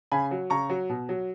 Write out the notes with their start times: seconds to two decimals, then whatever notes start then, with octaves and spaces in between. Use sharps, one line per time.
0.12 C#3 G#5 B5
0.31 F#3
0.50 C#3 A#5 C#6
0.70 F#3
0.90 B2
1.09 F#3